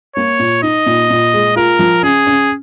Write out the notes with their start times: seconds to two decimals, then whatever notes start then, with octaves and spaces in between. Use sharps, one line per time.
0.16 A#3 C#5
0.39 A#2
0.63 D#4 D#5
0.86 A#2
1.10 A#2
1.34 G#3
1.56 F4 A#4
1.79 F3
2.03 C#4 G#4
2.27 C#4